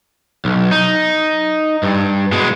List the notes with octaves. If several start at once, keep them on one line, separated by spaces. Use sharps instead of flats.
B1
D#4
G2
B2 G#3